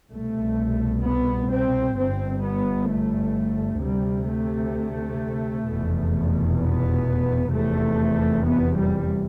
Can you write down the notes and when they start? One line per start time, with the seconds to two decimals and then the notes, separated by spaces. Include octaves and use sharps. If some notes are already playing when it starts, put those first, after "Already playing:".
0.12 C2 B2 A3
1.04 B3
1.50 C4
1.98 G1 G2 C4
2.43 B3
2.89 A3
3.82 D2 C3 G3
4.29 A3
5.68 F1 E2 B2
6.61 B3
7.53 F1 E2 C3 A3
8.46 B3
8.77 G3